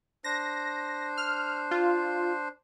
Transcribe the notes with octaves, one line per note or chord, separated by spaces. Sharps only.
D4 C5 A#6
F6
F4